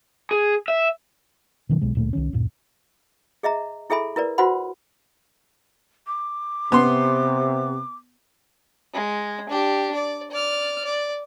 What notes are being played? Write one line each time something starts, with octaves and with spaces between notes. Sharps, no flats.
G#4
E5
B2 D#3 F#3
B1 B2 G#3
D1 A#2 A3
C2 D#3 C#4
D1 F#2 A#2
G#4 D#5 E5 A#5
E4 G#4 A4 E5 G#5 B5
E4 A#4 B4 D5
F4 F#4 B4 C5 F#5 B5
D6
C3 B3 C6
G#3
D4 G4
D5
D5 F6
D5